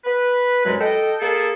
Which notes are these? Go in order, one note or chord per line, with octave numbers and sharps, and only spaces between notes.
B4
C2 F#2 F#3 G#3 B4
A4 D#5 G5
A#3 G#4 A4